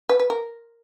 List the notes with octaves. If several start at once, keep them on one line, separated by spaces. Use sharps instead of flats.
B4
B4
A#4